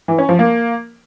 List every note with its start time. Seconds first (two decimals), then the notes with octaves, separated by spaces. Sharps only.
0.08 E3
0.18 C#4
0.29 F3
0.39 A#3